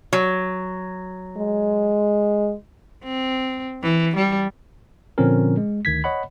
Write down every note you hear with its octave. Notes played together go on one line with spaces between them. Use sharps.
F#3
G#3
C4
E3
G3
A#2 D3 F3 C4 C#4 A#4
G#3
D2 D#3 G#6 B6
C#5 D#5 F#5 B5